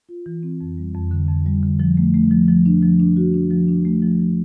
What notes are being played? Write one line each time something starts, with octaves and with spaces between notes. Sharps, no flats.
F4
E3
C4
F2
G3
F2
D3
F2
G3
D3
F3
A3
A3
F3
F3
D4
F3
D4
F#4
D4
F3
D4
A3
F3
F3